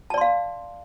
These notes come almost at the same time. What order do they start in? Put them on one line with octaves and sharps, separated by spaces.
A5 D5 C6 F5